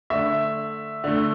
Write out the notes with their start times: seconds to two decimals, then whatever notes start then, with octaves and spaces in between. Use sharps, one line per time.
0.10 D3 A3 E5
1.04 D3 A3